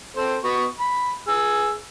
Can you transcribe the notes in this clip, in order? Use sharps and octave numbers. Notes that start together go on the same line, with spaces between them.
C4 A4 C5
B3 F#4 C#6
B5
G#4 E6